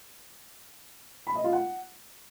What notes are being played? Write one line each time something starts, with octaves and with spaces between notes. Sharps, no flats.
B5
D#5
F4
F#5